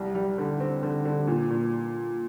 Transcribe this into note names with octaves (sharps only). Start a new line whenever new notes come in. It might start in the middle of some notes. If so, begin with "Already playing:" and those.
Already playing: C2 G3
G3
D3
C4
D3
D3
A#2
A#2